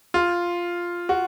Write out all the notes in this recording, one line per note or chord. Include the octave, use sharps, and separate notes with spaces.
F4
F#4